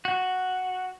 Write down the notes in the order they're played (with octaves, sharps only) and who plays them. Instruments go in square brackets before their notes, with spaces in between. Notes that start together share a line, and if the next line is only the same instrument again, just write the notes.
[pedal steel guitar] F#4